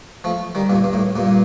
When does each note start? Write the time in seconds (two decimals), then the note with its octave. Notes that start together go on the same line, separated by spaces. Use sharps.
0.24 F3 A3
0.55 D#3 G3
0.70 G2 A#2
0.84 G2
0.93 A2
1.16 G2 A#2